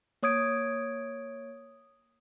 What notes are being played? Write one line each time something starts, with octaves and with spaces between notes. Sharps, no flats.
A#3 C#5 D#6 G#6 D7